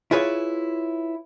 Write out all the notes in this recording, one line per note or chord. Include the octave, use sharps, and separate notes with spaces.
E4 F4 G#4 B4 C#5